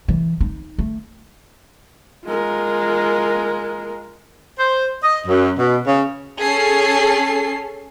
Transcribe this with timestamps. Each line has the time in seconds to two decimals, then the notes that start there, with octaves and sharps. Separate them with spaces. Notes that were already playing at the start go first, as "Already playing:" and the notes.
0.08 E3
0.41 D#4
0.78 A3
2.26 G#3 F4 A#4
4.59 C5
5.03 D#5
5.27 F#2
5.59 B2
5.87 C#3
6.41 C#4 G#4 A4 C7